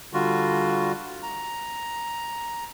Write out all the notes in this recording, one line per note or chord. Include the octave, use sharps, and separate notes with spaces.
D3 G3 F4 F#4
A#5